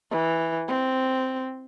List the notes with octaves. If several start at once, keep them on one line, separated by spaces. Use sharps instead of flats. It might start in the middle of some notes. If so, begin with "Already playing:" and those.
E3
C4